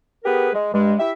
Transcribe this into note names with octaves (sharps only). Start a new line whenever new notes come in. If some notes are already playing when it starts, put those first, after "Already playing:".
B3 G4 G#4 A#4 B4
G#3
G2 G#3
E4 G4 E5